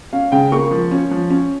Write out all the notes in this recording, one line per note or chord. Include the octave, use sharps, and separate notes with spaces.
C#4 F5
C#3 G5
A#3 C#6
F3
C#4
F3
C#4